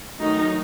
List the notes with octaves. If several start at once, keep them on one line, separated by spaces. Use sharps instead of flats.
D#3 F#3 A3 D#4